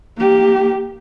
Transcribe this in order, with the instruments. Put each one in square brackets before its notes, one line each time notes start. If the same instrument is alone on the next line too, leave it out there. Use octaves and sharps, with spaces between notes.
[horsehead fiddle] A#3 G4